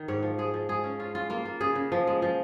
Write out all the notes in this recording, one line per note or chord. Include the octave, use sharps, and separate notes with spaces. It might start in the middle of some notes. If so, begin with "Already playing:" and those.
Already playing: D#3
G#2 C#5
F3
G#3 G#4
F3
G#3 G#4
C#4
C#4 F4
C#4 F4
A#3 F4
A#3
C#3 G#4
C#3
F3
G#3
F3